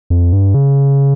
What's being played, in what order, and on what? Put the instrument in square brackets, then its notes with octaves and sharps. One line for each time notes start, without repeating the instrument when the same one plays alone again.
[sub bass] F2
G2
C#3